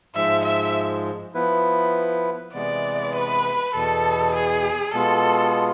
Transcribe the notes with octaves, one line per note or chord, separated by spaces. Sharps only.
G#2 F3 G#3 E5
E5
F3 B3 E4 B4
C3 E3 G#3 B3 D5
B4
E2 B2 B3 A4
G#4
B2 G#3 B3 F4 A4